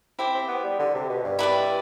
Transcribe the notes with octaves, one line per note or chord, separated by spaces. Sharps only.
C4 E4 G4 C5 G5
C4
B3
G3
D3
C3
B2
G2
E4 B4 D5 G5